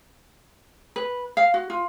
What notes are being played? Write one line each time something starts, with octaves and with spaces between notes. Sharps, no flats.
B4
F5
F#4
F4